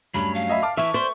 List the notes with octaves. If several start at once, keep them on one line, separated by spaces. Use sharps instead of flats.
G2 F#3 A3 C#4 B5
F5
D#5 E5 B5
A5 D6 F6
E3 E4 E5 C#6
C5 D5 G5 B6